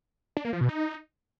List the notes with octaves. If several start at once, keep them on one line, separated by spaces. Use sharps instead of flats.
D4
A#3
F3
B2
D#4